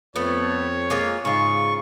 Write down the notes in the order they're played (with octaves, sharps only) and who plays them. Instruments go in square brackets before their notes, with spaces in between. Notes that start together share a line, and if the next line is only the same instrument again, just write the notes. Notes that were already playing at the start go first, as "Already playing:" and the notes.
[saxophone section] F2 [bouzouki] A3 B3 [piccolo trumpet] C#5
[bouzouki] G#3 A#3 F4
[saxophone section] G#2 [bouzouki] C#3 F4 [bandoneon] C#6